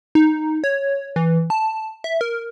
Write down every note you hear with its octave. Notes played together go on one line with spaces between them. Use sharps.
D#4
C#5
E3
A5
E5
A#4